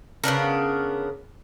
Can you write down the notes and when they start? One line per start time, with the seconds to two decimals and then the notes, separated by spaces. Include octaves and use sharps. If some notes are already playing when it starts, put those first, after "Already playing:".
0.24 C#3 B3 D4 A#4